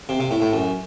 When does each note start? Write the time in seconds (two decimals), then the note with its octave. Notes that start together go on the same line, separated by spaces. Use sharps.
0.09 C3
0.20 C3
0.31 A2
0.42 A2
0.53 F#2